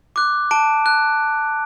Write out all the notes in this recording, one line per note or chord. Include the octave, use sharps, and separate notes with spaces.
D6 F#6
A5 D7
F#6